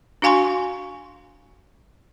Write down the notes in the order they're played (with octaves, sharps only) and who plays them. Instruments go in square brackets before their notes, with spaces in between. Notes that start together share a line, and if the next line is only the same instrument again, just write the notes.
[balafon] D4 F#4 F5 G#5 C6 C#6